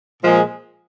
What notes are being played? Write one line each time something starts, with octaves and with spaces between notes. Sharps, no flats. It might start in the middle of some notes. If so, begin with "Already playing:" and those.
A#2 F3 G#3